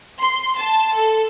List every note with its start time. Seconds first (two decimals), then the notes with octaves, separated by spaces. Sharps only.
0.21 C6
0.58 A5
0.95 A4